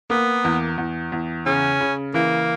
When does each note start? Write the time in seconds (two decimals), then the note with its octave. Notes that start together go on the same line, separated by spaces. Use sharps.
0.10 A#3 B3
0.44 E2
0.78 E2
1.12 E2
1.46 C#3 C#4
1.81 C#3
2.14 E3 A#3